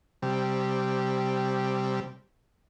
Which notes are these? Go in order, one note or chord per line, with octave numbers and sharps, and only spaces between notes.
C3 G3